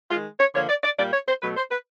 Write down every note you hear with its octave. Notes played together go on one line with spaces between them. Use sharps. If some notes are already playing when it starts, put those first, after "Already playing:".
D#3 G#3 F4
C#5
D3 F3 A#3 C#5
D5
D5
A#2 G3 A#3 D5
C#5
C5
B2 F#3 A3 B4
C5
B4